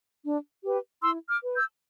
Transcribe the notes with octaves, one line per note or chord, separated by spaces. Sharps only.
D4
G4 B4
E4 C6 E6
D6 F6
B4
E6 G6